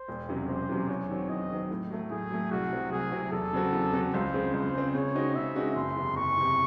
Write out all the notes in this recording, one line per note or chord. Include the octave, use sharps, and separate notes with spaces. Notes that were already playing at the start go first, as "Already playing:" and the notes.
Already playing: C5
E1
E2 C3 F#3 C#4
E1 C5
E2 C3 F#3 C#4
E2 C#5
D#3 F#3 C4
E2 D#5
D#3 F#3 C4
A2
F#3 A3
A2 G#4
F#3 A3
C2 F#4
C3 F#3 C4
C2 G#4
C3 F#3 C4
E2 A4
C#3 F#3 C4 F#4
E2
C#3 F#3 C4 F#4
C#2 C5
C#3 G#3 C4
C#2 C5
C#3 G#3 C4
C#3 C#5
G#3 C4 D#4 F#4
C#3 E5
G#3 C4 D#4 F#4
F#1 C6
E2 C3
F#1 C#6
E2 C3